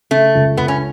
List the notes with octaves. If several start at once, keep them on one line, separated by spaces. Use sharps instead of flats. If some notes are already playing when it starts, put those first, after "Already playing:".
C#3 A3
C#2
C#2 B3
C#4